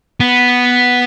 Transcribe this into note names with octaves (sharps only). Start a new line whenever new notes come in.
B3